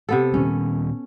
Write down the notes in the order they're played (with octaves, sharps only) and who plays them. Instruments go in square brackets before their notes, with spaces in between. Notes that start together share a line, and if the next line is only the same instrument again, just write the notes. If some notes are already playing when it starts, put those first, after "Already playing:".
[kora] C3 B3 A4
[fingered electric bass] A#2 D#3 G3 [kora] C#4